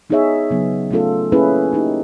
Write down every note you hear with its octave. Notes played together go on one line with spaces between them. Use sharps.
B3 D#4 G#4 C#5 E5
C#3 F#3 B3
A3 C#4 F4 A4
A#3 C#4 E4 G#4 B4
A#3 D#4 G4